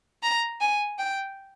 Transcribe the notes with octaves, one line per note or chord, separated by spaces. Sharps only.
A#5
G#5
G5